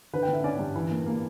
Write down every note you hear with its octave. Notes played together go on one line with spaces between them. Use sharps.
D3 B4
G5
D3
E5
C#4 D5
G2
E3
A#3
A#3